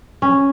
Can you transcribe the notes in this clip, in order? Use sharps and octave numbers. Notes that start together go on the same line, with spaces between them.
C#4